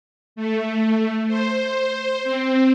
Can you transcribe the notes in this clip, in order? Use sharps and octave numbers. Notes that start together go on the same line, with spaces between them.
A3
C5
C4